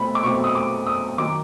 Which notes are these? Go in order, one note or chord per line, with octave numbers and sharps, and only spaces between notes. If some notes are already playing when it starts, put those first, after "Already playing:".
Already playing: B2 A3 C4 B5
D6
B2 F#3 A3 C4 C#6
D#6
D6
D#6
D#3 F#3 A#3 D6